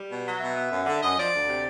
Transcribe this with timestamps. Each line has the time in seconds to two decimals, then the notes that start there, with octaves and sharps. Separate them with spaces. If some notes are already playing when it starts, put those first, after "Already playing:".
Already playing: G3
0.09 B2
0.25 F#3
0.40 B2 E5
0.55 B3
0.71 F#2
0.86 D3
1.01 F#2 D#5
1.17 F3 D5
1.33 D2
1.48 C3